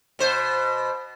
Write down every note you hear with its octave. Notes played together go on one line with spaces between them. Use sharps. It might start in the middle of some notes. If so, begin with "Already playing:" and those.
B2 C5